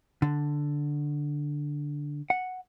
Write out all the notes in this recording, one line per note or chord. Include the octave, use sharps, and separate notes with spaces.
D3
F#5